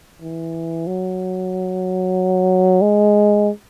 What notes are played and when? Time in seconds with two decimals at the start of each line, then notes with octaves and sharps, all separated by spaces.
0.22 E3
0.87 F#3
2.81 G#3